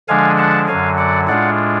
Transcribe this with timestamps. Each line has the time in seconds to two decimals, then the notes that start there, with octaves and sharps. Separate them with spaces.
0.08 D3 F3 G#3 D4 F5 G#5
0.38 F#5 A5
0.68 F#2 D3 F#3 F5 G#5
0.98 D5 F#5
1.28 A2 G#3 D4 F4 D5 F#5